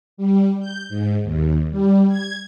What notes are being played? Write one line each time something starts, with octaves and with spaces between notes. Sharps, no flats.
G3
G6
G#2
D#2
G3
G#6